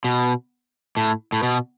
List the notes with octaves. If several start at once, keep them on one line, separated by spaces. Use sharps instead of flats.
B2
A2
A2
B2